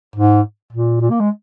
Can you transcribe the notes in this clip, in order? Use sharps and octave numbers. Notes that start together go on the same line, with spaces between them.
G#2
A#2
A#2
A#3
G#3